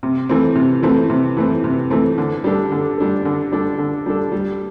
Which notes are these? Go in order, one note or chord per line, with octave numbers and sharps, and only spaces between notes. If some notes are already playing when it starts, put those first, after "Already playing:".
C3
E3 A3 C4
C3
E3 A3 C4
C3
E3 A3 C4
C3
E3 A3 C4
D3
G3 D4 A4
D3
G3 D4 A4
D3
G3 D4 A4
D3
G3 D4 A4
G3